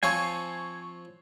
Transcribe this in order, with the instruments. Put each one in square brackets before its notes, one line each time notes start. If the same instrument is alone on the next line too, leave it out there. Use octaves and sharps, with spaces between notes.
[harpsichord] F3 C4 C#5 [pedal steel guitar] G#5 [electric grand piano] C#6 G#6 C7